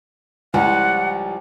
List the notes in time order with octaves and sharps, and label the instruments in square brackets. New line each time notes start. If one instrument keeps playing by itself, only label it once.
[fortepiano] C#2 [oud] F3 G3 E4 [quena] F#5